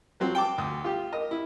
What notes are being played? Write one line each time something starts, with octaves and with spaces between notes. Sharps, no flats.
F3 F#3 C4
G5 A5 D6
D2 D#6
F4 G4
A#4 D#5
E4